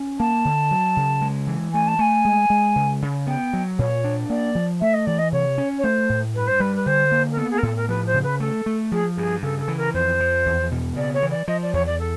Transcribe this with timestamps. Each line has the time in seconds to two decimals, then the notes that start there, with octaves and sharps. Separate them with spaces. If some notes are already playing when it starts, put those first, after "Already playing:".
Already playing: C#4
0.19 A#3 A5
0.45 D3
0.71 F#3
0.97 C#3
1.21 G#3
1.47 E3
1.73 A3 G#5
1.87 A5
1.99 A3 G#5
2.25 G#3
2.50 G#3
2.76 C#3
3.02 C#3
3.27 B3 G5
3.53 F#3
3.79 A#2 C#5
4.04 D4
4.30 A#3 D5
4.55 F3
4.81 A3 E5
4.94 D#5
5.06 E3 D5
5.18 D#5
5.32 C3 C#5
5.58 C#4
5.78 C#5
5.84 A3 C5
6.09 A2
6.35 G2 B4
6.47 C5
6.60 G3 B4
6.76 B4
6.86 D3 C5
7.11 A#3
7.32 A#4
7.37 B3 A4
7.50 G#4
7.58 A#4
7.63 A2 A4
7.76 A#4
7.89 F3 B4
8.06 C5
8.14 C#3
8.23 B4
8.40 A3 A4
8.66 A3
8.91 F3 G#4
9.16 G2 G#4
9.43 C#3 A4
9.60 A4
9.68 E3
9.77 A#4
9.94 F2 C5
10.20 F3
10.46 E2
10.71 B2
10.96 C#3 D5
11.13 C#5
11.23 E3
11.31 D5
11.48 F3 D#5
11.62 D5
11.73 E2 C#5
11.86 D5
11.99 A4